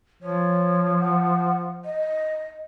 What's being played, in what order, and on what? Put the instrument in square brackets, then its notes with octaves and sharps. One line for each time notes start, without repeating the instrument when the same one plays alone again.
[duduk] F3 [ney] C#5
[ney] F#5
D#5